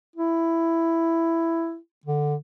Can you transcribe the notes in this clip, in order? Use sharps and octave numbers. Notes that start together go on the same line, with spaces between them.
E4
D3